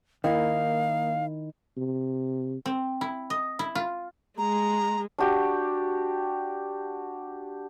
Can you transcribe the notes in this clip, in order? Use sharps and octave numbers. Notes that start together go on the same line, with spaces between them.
D#3 A#3 D#4 E4 A#4 F5
C3
C4
E4
D#5
E4
F4
G#3 A#5
D4 F#4 G4